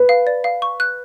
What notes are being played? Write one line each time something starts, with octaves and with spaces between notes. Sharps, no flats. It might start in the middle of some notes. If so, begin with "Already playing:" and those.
Already playing: B4
F5
D5
F5
C#6
F#6